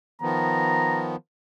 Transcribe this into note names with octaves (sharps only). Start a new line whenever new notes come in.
D#3 F3 B3 A#5